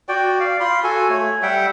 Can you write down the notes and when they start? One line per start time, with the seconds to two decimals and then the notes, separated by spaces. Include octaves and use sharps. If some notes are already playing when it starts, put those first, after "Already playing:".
0.09 F#4 D5 G5
0.40 D5 F5
0.60 F4 B5 C6
0.84 F#4 A4 G#5
1.09 A3 C#5
1.43 G3 E5 F#5 G5